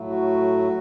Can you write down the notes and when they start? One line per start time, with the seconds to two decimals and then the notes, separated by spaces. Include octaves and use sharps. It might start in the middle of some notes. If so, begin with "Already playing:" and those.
Already playing: A2 F#3 A3
0.10 F#4